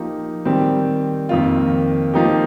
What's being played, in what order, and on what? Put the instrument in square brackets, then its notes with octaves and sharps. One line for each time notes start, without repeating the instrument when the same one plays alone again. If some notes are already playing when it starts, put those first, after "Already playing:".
Already playing: [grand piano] F3 A#3 D#4 G4
D#3 G3 C4 G4
F2 D#3 A#3 F4
F3 A#3 D#4 G4